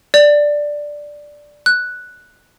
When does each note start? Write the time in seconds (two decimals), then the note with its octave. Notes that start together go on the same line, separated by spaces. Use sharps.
0.14 D5
1.66 F#6